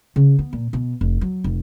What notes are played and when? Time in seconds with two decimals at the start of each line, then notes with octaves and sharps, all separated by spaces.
0.16 C#3
0.39 B3
0.53 A#2
0.73 B2
1.01 F1
1.21 F#3
1.44 F1